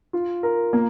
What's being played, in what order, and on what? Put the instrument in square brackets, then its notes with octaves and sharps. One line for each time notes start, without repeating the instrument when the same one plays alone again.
[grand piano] F4
A#4
A#3